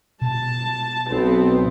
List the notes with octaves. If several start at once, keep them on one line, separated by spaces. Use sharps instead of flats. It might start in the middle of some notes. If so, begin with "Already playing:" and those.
B2 A5
B1 B3 C4